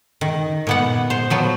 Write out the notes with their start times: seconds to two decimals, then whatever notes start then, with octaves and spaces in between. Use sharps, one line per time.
0.21 D#3
0.67 A#2 B3 F#5
1.10 C5
1.30 F3 F#3 B3